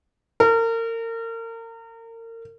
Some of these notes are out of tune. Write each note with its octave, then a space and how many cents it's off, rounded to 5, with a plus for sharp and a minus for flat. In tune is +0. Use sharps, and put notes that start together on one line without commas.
A#4 -35